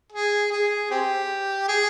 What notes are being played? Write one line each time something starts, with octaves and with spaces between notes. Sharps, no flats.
G#4
G#4
C4 G4
G#4